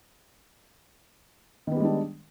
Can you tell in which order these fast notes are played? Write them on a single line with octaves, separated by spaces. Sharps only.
D#3 B3 G3 G#3 D4